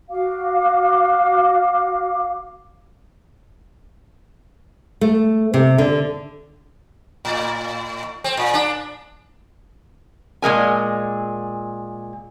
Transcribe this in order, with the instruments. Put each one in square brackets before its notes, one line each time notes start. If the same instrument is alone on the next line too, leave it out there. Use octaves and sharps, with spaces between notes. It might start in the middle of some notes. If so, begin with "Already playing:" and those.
[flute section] F#4 F5 D6
[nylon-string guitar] A3
C3
D3
[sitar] A2
C4
A#2
D4
[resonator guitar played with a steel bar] A#2 G#3 A#4 G#5